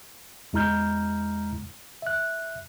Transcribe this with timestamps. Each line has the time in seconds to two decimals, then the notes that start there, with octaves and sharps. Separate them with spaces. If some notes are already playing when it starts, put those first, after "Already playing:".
0.53 E2 G#3 E4 A#5 F6 G6
2.02 E5 F#6